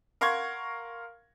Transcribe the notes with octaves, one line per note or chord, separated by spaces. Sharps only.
A#4 F5 F#5 C6 C#6 G#6